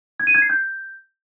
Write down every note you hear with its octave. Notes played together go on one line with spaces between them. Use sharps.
G#6
D#7
G#6
C7
G6